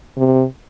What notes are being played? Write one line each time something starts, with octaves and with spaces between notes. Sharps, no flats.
C3